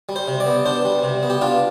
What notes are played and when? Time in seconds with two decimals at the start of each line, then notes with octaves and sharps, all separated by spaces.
0.09 G3
0.16 C5
0.28 C3
0.40 D5
0.46 B3
0.66 D4 C5
0.85 G3
1.03 C3
1.23 B3
1.30 G4
1.41 D4 F4